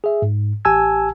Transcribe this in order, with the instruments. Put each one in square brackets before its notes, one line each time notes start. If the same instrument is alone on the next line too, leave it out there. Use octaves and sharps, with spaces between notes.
[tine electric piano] G#4 E5
G#2
A1 G4 G#5 A5 E6 G#6